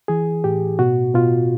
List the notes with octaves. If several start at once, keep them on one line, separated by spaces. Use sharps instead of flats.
E3 G#4
A2 G4
B2 F#4
B2 F4